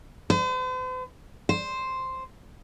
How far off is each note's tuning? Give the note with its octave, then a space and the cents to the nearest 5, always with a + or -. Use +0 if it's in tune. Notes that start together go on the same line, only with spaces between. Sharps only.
C5 -45
C5 +0